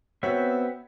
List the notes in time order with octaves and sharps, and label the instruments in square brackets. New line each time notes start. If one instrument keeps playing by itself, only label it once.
[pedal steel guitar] B3 C4 E5 [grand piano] F#4 C#5